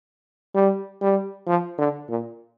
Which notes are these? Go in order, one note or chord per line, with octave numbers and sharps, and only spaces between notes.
G3
G3
F3
D3
A#2